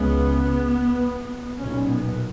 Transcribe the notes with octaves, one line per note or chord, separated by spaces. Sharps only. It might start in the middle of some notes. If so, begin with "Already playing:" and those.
Already playing: C#2 C#3 B3
B1 A#2 C#4
B3